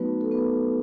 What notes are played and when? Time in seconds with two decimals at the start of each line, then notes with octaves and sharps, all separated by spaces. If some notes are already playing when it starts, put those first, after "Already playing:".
Already playing: F#3 A3 B3 D#4 F#4 B4
0.21 A4
0.31 B3 B4